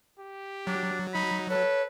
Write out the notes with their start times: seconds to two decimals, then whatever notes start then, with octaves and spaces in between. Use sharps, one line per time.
0.19 G4
0.67 F#3 D4
1.14 D#4 B5
1.50 A4 B4 C#5